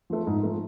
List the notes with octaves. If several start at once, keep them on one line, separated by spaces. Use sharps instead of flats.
F3 A3
G#2
F3 A3